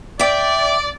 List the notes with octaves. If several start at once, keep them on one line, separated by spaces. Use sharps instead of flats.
D5 E5 G5